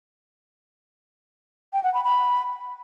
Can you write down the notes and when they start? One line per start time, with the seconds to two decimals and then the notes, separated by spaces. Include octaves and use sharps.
1.73 G5
1.84 F#5
1.94 B5
2.04 B5